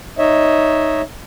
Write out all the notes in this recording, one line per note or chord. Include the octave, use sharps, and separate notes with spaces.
D#4 C#5 D#5 E5